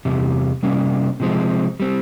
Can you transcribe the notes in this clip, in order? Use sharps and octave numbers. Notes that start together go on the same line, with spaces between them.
E2 C3 G3
C3 G3 A#3 C#4
C3 F3 G#3 C4
G3 C4